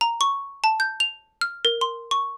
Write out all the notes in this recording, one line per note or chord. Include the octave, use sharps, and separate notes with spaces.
A#5
C#6
A5
G6
F7
F6
A#4
C6
C#6